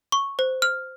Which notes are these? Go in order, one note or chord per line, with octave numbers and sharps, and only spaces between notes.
C#6
C5
F6